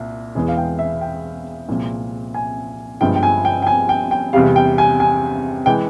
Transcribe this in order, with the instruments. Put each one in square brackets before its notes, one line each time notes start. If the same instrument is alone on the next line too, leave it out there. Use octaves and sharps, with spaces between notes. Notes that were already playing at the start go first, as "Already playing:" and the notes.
Already playing: [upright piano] C2 A#2
E1 E2 E3 G#3 G#4
F5
G5
E5
G5
C2 A#2 F3 G#3
G#5
G1 G2 F3 G#3 G5
G5
G#5
G5
G5
G#5
G5
G5
E2 C3 G3 F5
G5
G#5
G#5
E3 G#3 G5